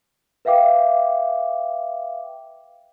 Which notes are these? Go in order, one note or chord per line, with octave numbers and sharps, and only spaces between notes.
B4 E5 F5 G5 D6